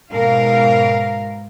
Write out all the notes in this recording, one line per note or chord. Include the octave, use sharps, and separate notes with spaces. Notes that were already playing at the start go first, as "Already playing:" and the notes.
G#2 B2 A#4 F5